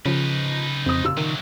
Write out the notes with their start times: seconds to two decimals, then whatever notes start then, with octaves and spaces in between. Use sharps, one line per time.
0.06 C#3 F3 D#4 B4
0.86 F2 C4 D#6
1.04 F1 A#2 F4 E6
1.17 C3 D#3 F#3